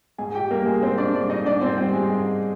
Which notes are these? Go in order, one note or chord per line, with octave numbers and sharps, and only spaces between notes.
G#2 G#4 G#5
G4 G5
G3 A#3 A#4
G#3 G#4
G#2 C4 C5
D4 D5
G3 D4 D5
D#4 D#5
G#2 D4 D5
C4 C5
G3 C4 C5
G#3 G#4
G#2